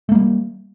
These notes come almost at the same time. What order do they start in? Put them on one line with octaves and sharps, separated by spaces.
A3 A#3 G3